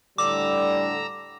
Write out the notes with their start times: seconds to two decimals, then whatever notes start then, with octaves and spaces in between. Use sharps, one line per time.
0.18 A2 D3 G3 A#5 D6 E6